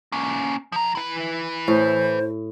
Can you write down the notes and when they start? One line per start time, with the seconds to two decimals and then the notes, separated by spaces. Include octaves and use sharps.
0.12 A#3 C#4
0.72 F3 A#5
0.95 E4 B4
1.68 A2 C5